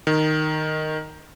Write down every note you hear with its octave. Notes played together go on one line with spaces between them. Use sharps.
D#3